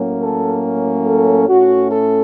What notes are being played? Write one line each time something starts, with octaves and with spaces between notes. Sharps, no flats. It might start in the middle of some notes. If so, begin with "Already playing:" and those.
Already playing: A2 F#3 A#3 C#4
A4
A4
A2 A3 C#4 F#4
A4